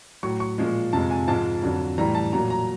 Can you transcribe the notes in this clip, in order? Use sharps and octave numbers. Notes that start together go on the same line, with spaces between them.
A2 F#3 C#6
C#6
A#2 F3 G#3
F2 C3 F3 G#3 A5
G#5
G#2 F3 G#3 A5
F2 D3 F#3
A2 E3 G3 A#5
A5
A#2 F#3 A#5
A#5